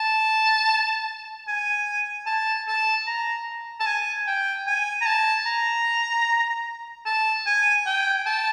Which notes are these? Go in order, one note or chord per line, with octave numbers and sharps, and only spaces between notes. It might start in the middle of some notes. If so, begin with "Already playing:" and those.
Already playing: A5
G#5
A5
A5
A#5
A5
G#5
G5
G#5
A#5
A5
A#5
A5
G#5
G5
A5